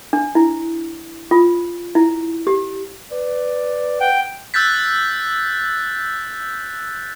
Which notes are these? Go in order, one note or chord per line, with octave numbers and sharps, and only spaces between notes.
D4
E4
F4
E4
G4
B4 D5
F#5 G5
E6 F#6 G6 A6 B6